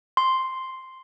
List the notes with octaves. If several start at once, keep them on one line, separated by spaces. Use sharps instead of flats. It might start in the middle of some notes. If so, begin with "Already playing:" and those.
C6